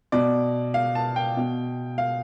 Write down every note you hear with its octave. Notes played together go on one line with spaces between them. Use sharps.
B2 D5
F5
A5
G5
B2
F5